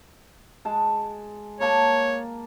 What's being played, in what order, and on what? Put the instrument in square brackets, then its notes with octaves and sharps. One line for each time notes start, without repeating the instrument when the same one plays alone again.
[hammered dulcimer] G#3 A5
[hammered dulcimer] A#3 A5 [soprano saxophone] C#5